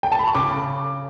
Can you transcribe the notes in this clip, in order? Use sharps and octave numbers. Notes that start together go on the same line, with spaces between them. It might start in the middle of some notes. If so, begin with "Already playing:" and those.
G5
A5
B5
C#6
C#3 D6